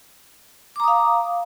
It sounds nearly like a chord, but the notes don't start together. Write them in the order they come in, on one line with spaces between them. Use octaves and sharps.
D6 A#5 D#6 F5